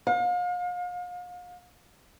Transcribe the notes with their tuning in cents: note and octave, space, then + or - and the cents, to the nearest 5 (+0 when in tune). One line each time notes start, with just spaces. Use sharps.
F5 +40